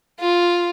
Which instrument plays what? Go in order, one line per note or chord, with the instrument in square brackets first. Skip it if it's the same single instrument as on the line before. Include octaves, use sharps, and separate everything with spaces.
[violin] F4